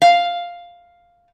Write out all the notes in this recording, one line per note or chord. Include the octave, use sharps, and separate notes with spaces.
F5